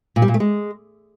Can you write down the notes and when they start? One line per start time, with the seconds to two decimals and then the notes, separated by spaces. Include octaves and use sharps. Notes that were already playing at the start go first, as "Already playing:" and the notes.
0.16 A#2
0.22 G3
0.28 A#2
0.34 A3
0.40 G#3